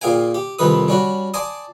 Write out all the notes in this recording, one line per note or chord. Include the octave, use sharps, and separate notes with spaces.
A#2 G#4 F5 G5 G#5
G4
C2 F2 D#3 B4 D#6
G3 C#4 F#4
D5 G#5 A5 C6 D#6